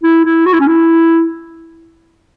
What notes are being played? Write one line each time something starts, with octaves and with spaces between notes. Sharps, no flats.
E4
E4
F#4
E4
C#4
E4